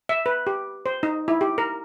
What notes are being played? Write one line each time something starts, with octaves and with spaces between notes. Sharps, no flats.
E5
B4
G4
C5
D#4
E4
G4
A#4